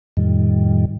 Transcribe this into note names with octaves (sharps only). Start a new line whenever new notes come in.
F2 A2 D#3 G3